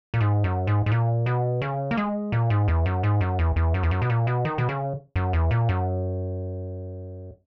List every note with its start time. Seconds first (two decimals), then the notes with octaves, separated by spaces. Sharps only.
0.14 A#2
0.21 G#2
0.44 F#2
0.67 G#2
0.86 G#2
0.91 A#2
1.26 B2
1.62 C#3
1.91 A#3
1.97 G#3
2.32 A#2
2.50 G#2
2.68 E2
2.86 F#2
3.03 G#2
3.21 F#2
3.39 E2
3.56 E2
3.74 F#2
3.83 E2
3.91 F#2
4.02 B2
4.10 A#2
4.27 B2
4.45 D#3
4.58 B2
4.69 C#3
5.16 F#2
5.33 E2
5.51 A#2
5.69 F#2